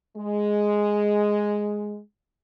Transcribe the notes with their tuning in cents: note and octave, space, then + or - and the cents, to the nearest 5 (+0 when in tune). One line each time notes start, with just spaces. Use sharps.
G#3 +0